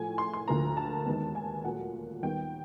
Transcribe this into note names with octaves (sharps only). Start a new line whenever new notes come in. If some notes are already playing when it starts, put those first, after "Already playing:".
Already playing: A2 F3 A3 G#5
C6
C6
D2 D3 F3 A#3 A#5
A5
D#2 D#3 G#3 B3
G#5
A#2 F#3 A3 F#5
D#2 D#3 G3 B3 G5